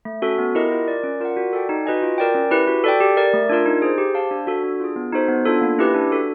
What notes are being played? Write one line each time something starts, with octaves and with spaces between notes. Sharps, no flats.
A3
C#4 F#4 A4
B3
E4 G4 A#4 D#5
F4
A#4 D5
C#4
F4 A#4 D5 F#5
F#4
A4 D5 G5
D#4
F#4 B4 D#5 G#5
F4
A#4 D5 G5
C#4
E4 G4 B4
F#4
A4 D5 G5
G4
A#4 D5
A3
D4 F4 A#4
D#4
G#4 C5
G4
C5 F5 A5
D4
F#4 A4
D4
F4 G#4
B3
D#4 F#4 A4 C5
B3
D4 F4 A4
A#3
C#4 E4 G4 B4
D4
F#4 A4